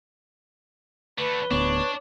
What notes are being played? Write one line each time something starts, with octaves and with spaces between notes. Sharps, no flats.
D3 A3 B4
D1 D2 B3 D4 C#5